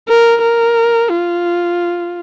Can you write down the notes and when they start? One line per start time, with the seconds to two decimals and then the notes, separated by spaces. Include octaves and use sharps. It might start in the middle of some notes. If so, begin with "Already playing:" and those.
0.08 A#4
0.42 A#4
1.10 F4